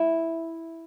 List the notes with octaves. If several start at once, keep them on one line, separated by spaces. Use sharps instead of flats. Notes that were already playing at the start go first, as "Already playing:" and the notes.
Already playing: E4